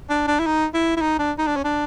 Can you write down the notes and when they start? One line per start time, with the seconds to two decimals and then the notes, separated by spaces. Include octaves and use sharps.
0.10 D4
0.27 D4
0.39 E4
0.46 D#4
0.74 E4
0.97 E4
1.01 D#4
1.19 D4
1.38 D#4
1.47 D4
1.56 C#4
1.64 D4